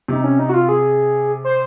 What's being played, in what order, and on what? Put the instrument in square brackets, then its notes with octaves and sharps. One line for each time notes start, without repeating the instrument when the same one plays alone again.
[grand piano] C3 [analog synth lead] D#4
[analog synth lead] C#4
D#4
F#4
F4
G#4
C5